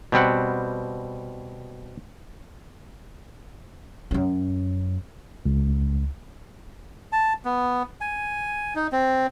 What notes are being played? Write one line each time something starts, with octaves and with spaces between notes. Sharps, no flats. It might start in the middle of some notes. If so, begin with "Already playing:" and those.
B2 G3 C4 F#5
F#2 C#4
C#2
A5
B3
G#5
D#4
C4